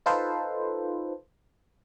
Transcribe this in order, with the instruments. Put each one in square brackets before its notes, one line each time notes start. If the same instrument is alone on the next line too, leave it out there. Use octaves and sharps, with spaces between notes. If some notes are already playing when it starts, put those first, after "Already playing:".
[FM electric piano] D#4 F4 A4 B4 C5